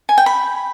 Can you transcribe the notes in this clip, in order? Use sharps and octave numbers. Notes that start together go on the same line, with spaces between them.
G#5
G5
B5